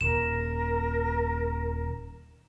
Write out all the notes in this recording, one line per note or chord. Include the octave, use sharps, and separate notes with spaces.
D#1 A#4 E7